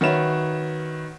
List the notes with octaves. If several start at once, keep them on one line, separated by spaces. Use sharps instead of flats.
D#3 F#4 B4 C#5 E5 E7